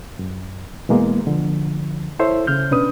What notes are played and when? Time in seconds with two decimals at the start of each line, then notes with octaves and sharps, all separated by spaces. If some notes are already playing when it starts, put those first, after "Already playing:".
0.19 F#2
0.89 B2 E3 G#3 A#3 B3
1.27 D3 F3
2.19 E4 A4 C5 C#5 E5
2.47 C#3 F6 G6
2.71 B2 C#4 D4 B4 D#6